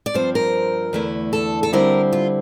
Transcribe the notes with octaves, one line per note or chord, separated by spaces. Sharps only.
D5
G2 F3 C4 C5
A#4
E2 D3 A3 E4
A4
A4
D3 G3 C4 E4 A#4
F4